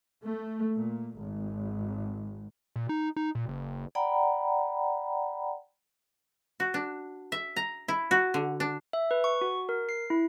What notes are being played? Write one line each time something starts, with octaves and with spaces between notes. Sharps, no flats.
A3
A#2
G#1
A#2
D#4
D#4
A#2
F#1
D5 F#5 G5 A#5 B5
F#4
D4
E5
A#5
E4
F#4
D3
D4
E5
B4
C#6
F#4
A#4
C7
E4